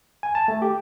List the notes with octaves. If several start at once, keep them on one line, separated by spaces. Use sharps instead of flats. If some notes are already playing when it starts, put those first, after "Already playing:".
G#5
A5
A3
G4